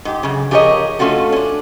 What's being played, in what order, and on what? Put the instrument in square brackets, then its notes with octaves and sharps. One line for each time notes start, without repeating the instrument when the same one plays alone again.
[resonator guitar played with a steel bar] G#2 G4
F#2 C#3
F3 G4 G#4 A#4 C#5 D#5
A3 C#4 F4 F#4 A4
C#4 D4